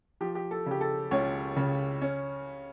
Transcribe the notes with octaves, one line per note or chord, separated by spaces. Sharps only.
F3 G4
G4
A4
C#3 G4
A4
C#2 C#4 C#5
C#3
C#4